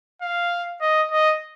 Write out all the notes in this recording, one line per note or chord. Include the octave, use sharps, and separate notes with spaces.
F5
D#5
D#5